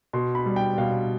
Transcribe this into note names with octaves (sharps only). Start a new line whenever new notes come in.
B2 C6
B5
G3
G5
B2 F5